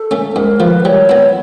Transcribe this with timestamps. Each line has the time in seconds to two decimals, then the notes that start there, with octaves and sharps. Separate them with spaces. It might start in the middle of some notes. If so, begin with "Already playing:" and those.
Already playing: A4
0.11 A3 C#4
0.35 G#2 A#4
0.60 F3 A3 B4
0.85 G3 C#5
1.09 B3 E4